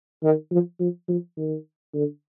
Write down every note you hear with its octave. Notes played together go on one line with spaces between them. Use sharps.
D#3
F3
F3
F3
D#3
D3